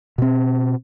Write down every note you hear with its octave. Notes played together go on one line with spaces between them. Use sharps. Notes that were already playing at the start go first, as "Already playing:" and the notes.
B2 C4